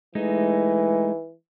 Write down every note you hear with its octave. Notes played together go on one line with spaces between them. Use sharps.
E3 G#3 A3 D#4